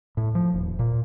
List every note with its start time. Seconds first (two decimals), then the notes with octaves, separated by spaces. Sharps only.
0.17 A2
0.35 F3
0.54 D#1
0.79 A#2